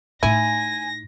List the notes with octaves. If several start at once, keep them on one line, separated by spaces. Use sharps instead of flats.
A2 D#4 E4 G#5 A#6